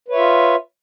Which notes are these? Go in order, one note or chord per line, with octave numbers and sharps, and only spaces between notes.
F4 B4 C#5 E5